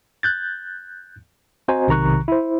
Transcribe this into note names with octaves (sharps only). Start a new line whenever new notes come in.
F#6 G6 A6
C4 F#4 C5 D#5 G#5 A#5
B1 C3 D#3 A#5 C#6 F#6
E4 C5